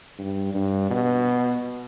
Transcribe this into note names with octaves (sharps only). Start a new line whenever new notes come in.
G2
G2
B2